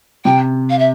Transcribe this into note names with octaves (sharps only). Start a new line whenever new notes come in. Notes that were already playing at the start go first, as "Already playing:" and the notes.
C3 G5
F5
E5